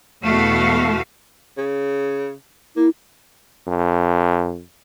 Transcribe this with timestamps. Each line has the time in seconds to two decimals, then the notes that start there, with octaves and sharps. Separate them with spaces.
0.23 E2 B2 A3 F#4 F5
1.58 C#3
2.76 A#3 E4
3.67 F2